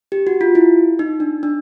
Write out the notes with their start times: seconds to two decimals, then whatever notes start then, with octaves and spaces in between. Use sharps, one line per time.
0.12 G4
0.27 F#4
0.41 F4
0.55 E4
0.99 D#4
1.20 D4
1.43 D4